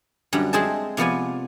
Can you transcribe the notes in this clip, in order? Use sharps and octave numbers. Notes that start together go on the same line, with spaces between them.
F#2 D3 F#3 G3
G#3 C4 G#4 C5 E5 A5
C3 F3 B3 D5 G#5